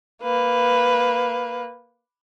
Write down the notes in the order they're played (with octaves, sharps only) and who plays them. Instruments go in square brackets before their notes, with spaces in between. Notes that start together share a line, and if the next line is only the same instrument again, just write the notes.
[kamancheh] A#3 B4